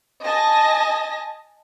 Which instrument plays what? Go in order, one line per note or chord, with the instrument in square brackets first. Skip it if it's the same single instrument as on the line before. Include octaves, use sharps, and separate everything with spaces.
[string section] D#5 G#5 A5 A#6